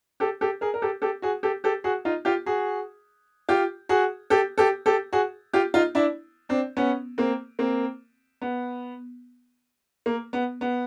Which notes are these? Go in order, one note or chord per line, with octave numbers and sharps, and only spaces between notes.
G4 A4
G4 A4
G#4 A#4
A#4
G4 A4
G4 A4
F#4 G#4
G4 A4
G4 A4
F#4 G#4
D#4 F4
F4 G4
F#4 G#4
F4 G4
F#4 G#4
G4 A4
G4 A4
G4 A4
F#4 G#4
F4 G4
D#4 F4
D4 E4
C4 D4
B3 C#4
A#3 C4
A#3 C4
B3
A#3
B3
B3